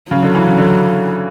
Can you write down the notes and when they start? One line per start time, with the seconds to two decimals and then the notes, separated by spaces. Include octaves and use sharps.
0.11 C#3 F#3
0.23 D3
0.35 E3
0.47 C#3
0.58 D3